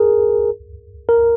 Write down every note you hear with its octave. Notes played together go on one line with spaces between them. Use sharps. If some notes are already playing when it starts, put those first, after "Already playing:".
Already playing: G#4 A#4
A#4